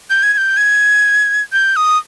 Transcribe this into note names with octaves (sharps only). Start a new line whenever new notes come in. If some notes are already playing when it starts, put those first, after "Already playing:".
G6
G#6
G#6
G6
G#6
G6
D#6